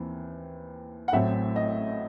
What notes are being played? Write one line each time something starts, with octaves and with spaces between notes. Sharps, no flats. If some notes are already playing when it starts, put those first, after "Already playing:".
Already playing: D#2 E3 C4
F#5
A1 A2 F#3 C4 E5
D#5